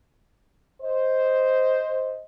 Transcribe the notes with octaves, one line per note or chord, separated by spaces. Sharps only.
C5 D#5